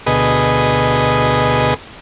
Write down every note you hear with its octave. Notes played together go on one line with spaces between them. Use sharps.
D2 B2 G#4 B4 D#5